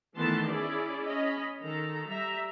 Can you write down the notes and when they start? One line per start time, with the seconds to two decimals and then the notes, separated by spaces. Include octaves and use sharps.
0.16 D#3 E3 A3 B3 A5 C6
0.48 C#4 E4 G#4 D5
1.05 C#4 D#5 B5
1.61 D#3 A4 A#5
2.08 G3 E5 A#5